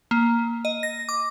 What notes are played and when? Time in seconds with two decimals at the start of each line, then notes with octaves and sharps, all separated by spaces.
0.11 A#3
0.65 D#5
0.83 A#6
1.09 D6